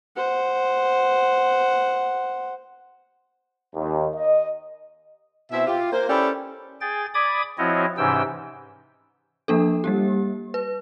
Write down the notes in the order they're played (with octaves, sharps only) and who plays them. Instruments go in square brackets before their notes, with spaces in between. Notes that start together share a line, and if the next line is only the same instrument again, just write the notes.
[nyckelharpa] C5 F#5
[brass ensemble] D#2
D#5
[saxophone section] B2 C4 E4 E5
F4 G4
A#3 C5
C#4 E4 G4 A4 C5 D5
[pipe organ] G#4 G5 A6
D5 B5 D6 D#6 G#6
F3 C4 E4 F#4 C#5 D#5
G#2 C3 E3 C#4 G5 E6
[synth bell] F3 A#3 D4 A4
G3 A#3 G4
B4